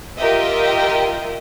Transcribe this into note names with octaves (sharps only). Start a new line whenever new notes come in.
F4 G4 A#4 D#5 E5 G5